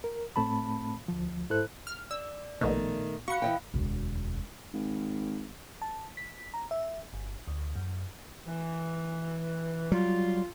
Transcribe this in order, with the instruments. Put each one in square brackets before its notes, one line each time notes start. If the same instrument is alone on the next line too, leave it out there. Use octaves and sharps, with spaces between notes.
[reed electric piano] A#4
A2 A3 C4 A5 B5
D2 F3
G#2 E4 A4 C5 F#6
[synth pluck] F6
[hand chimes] D5 [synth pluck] E6
[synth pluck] A#1 B2 [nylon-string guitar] D#3 A3
[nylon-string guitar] F#4 [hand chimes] F5 B5 F#6 [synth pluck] C#6 C#7
[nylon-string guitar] E3 D#5 G5
[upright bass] E1 D2
[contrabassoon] G#1
[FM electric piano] A5
B6
A#5
E5
G1
D2
F#2
[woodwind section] E3
[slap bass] F#3 G3 [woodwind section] F4